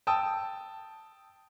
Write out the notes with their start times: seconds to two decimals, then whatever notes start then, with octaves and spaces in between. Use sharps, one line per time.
0.07 G5 A5 D#6 E6